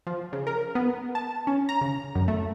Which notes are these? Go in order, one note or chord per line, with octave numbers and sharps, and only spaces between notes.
F3
C#3
A#4
B3
A5
C#4
A#5
C#3
F#2
A3